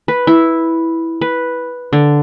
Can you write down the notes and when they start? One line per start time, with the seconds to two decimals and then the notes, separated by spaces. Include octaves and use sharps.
0.08 B4
0.27 E4
1.21 B4
1.93 D3